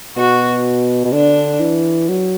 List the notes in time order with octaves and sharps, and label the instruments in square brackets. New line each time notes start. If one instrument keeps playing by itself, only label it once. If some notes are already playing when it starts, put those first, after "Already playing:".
[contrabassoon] B2 [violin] F#4
[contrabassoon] B2
[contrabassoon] D3 [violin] D4
[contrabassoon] E3
F#3